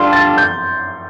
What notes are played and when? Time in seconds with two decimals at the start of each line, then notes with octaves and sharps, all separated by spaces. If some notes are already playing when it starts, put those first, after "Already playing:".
Already playing: D3 G3 D4 F4 C6
0.13 A6
0.38 G6